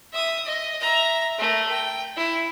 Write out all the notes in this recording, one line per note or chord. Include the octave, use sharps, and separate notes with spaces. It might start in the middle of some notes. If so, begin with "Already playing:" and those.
E5 D#6
D#5
E5 A#5
A3 A#4
G5
E4